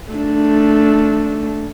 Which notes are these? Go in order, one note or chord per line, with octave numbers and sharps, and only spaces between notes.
A3 D4